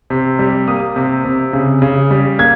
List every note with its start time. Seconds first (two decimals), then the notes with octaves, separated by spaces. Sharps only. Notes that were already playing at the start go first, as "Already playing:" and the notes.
0.10 C3
0.39 G3
0.68 A#3 D#6
0.96 C3
1.25 C3
1.53 C#3
1.82 C#3
2.11 G3
2.39 A#3 G#6